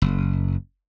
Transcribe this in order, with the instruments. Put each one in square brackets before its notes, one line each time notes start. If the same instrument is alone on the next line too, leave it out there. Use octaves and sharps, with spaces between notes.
[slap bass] F#1